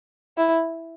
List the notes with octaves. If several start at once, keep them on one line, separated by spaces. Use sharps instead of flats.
E4